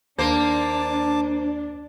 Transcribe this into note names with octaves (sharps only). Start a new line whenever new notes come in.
D#2 A#3 D4 C5 A5 D6